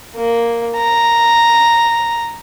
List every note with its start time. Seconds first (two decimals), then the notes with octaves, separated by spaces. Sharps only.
0.16 A#3
0.76 A#5